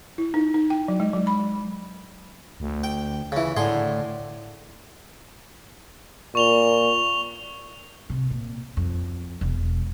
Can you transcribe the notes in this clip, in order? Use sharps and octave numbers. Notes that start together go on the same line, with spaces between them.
E4
D#4
D#4
G5
F#3
G#3
F#3
B5
F#3
D2
G5
C#3 E3
A2 D3 G#4 C6
A#2 C#6 F7 G7
C3
A#2
F2
E1